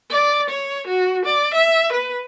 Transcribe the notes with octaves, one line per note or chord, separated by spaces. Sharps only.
D5
C#5
F#4
D5
E5
B4